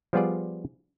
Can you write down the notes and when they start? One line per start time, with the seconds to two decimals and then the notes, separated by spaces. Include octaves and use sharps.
0.13 F3 G3 B3 F4 G#4 D5